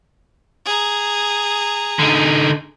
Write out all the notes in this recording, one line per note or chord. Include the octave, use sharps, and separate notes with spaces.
G#4 A#5
D3 D#4